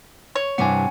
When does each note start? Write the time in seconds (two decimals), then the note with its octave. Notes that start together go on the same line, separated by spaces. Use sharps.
0.35 C#5
0.58 G2 C3 E3 F#5 G#5